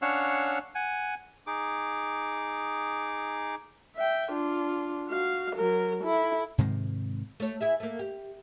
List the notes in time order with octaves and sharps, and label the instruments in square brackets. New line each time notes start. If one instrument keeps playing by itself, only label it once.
[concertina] C#4 D4 C#5 F5 F#5 E6
F#5 G#5
D#4 G#4 D6
[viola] E5 G5
D4 F4
F#4 F5
F#3 A#4
E4 A4
[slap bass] G#2 C3 D#3 G#3
[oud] A3 C#5
E4 G#4 E5
A3 A#3
G4